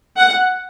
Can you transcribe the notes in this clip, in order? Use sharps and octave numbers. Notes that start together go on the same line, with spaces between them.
F#5